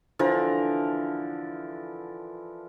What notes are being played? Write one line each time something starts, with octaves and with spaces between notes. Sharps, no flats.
D3 E3 F3 A#4